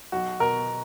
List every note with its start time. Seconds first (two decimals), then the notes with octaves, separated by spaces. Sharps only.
0.12 B1 F#4
0.40 B2 A#4